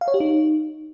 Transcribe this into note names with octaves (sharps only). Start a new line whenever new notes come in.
F5
C#5
G4
D#4